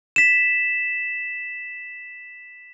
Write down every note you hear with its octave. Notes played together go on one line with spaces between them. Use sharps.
B6 E7